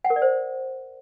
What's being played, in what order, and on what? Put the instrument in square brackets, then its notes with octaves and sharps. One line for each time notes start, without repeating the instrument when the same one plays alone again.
[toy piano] F#5
A#4
D5
C5